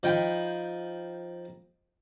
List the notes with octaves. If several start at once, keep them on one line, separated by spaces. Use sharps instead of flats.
F3 D#4 G5 G#5 B5